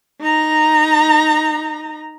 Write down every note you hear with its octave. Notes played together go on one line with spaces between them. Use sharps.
D#4 A#5